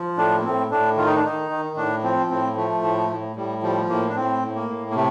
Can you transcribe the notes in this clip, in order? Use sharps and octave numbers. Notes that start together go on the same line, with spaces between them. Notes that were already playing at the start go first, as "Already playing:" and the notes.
Already playing: F3
A2 D4
A#3
A2 C4
A2 D4
D#3 F4
D#4
D4
D#3 D#4
D#3
A2 D4
F3 C4
A2 C4
F3 A3
A2
A2
A2 G3
F3 G3
A2 A#3
D4
A2 C4
A2
A#3
A2
A#3
C3 A3